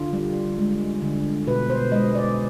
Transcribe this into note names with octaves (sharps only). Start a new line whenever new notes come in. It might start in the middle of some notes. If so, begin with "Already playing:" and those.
Already playing: D3 F4
G3
G#3
D3
B2 B4
C5
G#3 D#5
D5